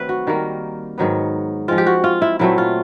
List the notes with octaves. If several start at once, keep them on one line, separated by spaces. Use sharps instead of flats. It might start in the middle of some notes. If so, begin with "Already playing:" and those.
Already playing: D#3 F#3 A3 C4 A4 B4
F#4
D#3 G3 A#3
G#2 D#3 F#3 B3
F3 G#3 C4 F4
G4
F#4
F4
E4
A#2 F#3 A3 C4 E4
F4